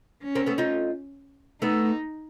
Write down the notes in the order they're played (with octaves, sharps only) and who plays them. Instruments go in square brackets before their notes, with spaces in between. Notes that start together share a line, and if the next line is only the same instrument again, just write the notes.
[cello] C#4
[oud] A#3 C4
A3 B3
D#4 F4
[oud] A3 B3 [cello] D#4